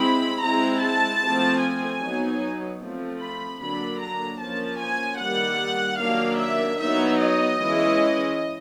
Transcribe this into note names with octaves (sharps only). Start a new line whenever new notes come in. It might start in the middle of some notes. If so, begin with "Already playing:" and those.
Already playing: G#3 C4 E4 B5
G#3 C4 E4 A#5
A5
F3 A3 C4
G#5
F#3 B3 D#4
F3 A3 C4
B5
D3 F#3 A#3 D4 B5
A#5
F3 A#3 C#4 A5
G#5
D#3 G3 A#3 F#5
D#3 F#3 A#3 D4 F5
E5
F#3 B3 D#4 E5
D#5
E3 G#3 C#4 E4